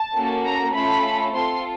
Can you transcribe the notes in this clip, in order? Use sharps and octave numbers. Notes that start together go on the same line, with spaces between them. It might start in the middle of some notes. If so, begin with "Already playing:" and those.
Already playing: A5
A#3 C#4 F#4 A4
A#5
A3 C#4 F4 A4 B5
C4 F4 A4 C6